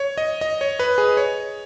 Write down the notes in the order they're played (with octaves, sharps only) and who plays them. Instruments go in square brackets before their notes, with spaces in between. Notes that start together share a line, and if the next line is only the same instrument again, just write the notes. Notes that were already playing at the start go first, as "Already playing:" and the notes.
Already playing: [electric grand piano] C#5
D#5
D#5
C#5
B4
G#4
C#5